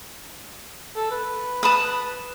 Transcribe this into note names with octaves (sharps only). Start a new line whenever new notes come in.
A4
B4
A5 B5 D#6